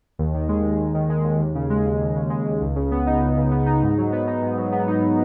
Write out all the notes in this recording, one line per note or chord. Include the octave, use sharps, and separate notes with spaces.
D#2
D#3
G#3
D#2
D#2
D#3
G#3
D#2
D#2
C#3
G#3
D#2
D#2
C#3
G#3
D#2
C#2
C#3
B3
D#4
C#2
C#3
B3
D#4
G#2
F#3
B3
D#4
G#2
F#3
B3
D#4